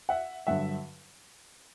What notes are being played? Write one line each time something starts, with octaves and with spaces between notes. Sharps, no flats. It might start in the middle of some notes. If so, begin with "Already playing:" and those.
E5 F#5
G2 D3 F#3 E5 F#5